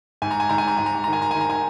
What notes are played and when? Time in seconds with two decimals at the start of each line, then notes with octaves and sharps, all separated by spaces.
0.22 G#2 G#5
0.31 A#5
0.40 G#5
0.49 G#2 A#5
0.58 G#5
0.68 A#5
0.77 G#2 G#5
0.86 A#5
0.95 G#5
1.04 D#3 A#5
1.13 G#5
1.22 A#5
1.31 D#3 G#5
1.41 A#5
1.50 G#5